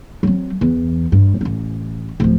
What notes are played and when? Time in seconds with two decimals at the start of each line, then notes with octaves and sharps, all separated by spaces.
0.23 F#3 C4
0.61 E2 E3
1.12 G2
1.41 A1 C#4
2.20 D1 F3